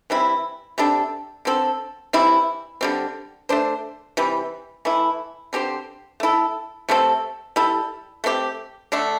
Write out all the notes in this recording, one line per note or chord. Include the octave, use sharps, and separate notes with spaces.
E3 G3 C4 E4
C3 G3 D4 A4
D3 C4 A4
E3 G3 C4 E4
D3 G3 C4
A3 D4 C5
C3 E3 G3
E3 A3 E4
D3 C4 G4 C5
A3 E4 A4
C3 A3 C4 A4
G3 E4 A4
A3 C4 G4
D3 A3 D4